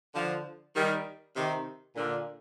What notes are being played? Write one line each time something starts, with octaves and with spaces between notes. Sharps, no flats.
D3 F3
D#3 G3
C3 D#3
A#2 D3